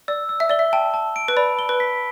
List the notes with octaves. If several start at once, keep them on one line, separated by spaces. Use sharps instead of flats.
D5 E6
E6
E5
D5 G7
E5
G5 A5
A5
D7
B4
D5 B5
G7
B4
B6